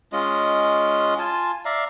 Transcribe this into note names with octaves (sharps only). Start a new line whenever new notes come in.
G#3 C#4 F4 D#5
F4 G#5 A5
D5 E5 F5 A#5